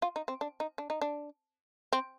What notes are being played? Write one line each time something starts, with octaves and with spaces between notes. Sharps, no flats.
F4
D#4
C4
D4
D#4
D4
D#4
D4
C4